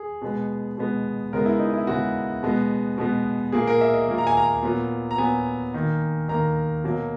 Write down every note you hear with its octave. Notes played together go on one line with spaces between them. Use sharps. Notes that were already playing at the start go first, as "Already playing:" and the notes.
Already playing: G#4
B2 G#3 B3
B2 G#3 B3
C#3 G#3 B3 A#4
E4
D#4
E4
C#3 G#3 B3 F#4
B2 G#3 B3
B2 G#3 B3
A#2 A#3 G#4
A#4
E5
D#5
A#2 A#3
A#5
G#5
A#5
A#2 F#3 B3
A#5
A#2 F#3 B3 G#5
D#3 A#3
D#3 A#3 A#5
B2 F#3 A#3